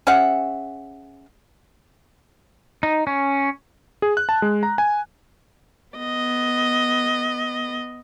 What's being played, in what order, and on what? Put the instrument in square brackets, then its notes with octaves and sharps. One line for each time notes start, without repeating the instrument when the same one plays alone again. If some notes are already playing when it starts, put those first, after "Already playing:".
[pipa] C#4 G#4 E5 F#5
[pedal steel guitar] D#4
C#4
[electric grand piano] G#4
F#6
A5
G#3
A#5
G#5
[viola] B3 D#5